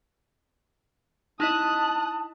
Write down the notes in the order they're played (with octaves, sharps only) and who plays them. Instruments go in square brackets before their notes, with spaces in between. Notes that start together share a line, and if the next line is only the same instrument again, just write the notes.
[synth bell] D#4 E4 D#5 [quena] A5 [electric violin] D#6 F#6